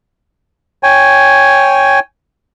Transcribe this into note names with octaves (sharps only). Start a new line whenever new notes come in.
C#5 G5 G#5